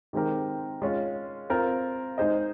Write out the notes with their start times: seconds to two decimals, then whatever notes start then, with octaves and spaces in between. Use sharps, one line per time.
0.13 D#3 G#3 C4 G4 A#4
0.82 G#3 C#4 F4
1.50 C4 F4 A#4
2.18 G#3 D#4 G#4 C5 D#5